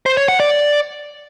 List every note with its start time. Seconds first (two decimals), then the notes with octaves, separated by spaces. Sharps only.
0.06 C5
0.17 C#5
0.28 F#5
0.40 D5